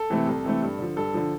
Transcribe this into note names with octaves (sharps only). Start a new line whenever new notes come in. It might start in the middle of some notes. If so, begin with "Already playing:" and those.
Already playing: A4
C3 E3 A3 C4
C2
C3 E3 A3 C4
G2
D3 F3
G2 A4
D3 F3